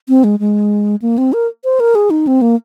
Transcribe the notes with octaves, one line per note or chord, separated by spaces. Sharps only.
C4
G#3
G#3
A#3
C4
A#4
C5
A#4
G#4
D#4
C4
A#3